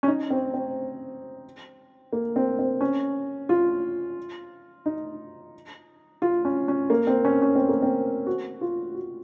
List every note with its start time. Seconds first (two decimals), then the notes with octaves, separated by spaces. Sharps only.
0.03 C#4
0.08 D#4
0.30 C4
0.54 C4
2.13 A#3
2.36 C4
2.59 C4
2.81 C#4
3.49 F4
4.86 D#4
6.22 F4
6.45 C#4
6.68 C#4
6.90 A#3
7.07 C4
7.25 C#4
7.42 C#4
7.56 C4
7.69 A#3
7.82 C4
8.27 F#4
8.61 F4
8.94 F#4